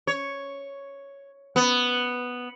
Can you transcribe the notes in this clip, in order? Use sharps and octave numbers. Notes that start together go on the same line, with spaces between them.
C#5
B3